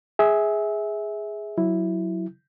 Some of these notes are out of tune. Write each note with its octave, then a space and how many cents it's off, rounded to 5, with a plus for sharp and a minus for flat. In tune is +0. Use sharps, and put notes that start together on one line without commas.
G#4 +0 E5 -20
F#3 +0 E4 +0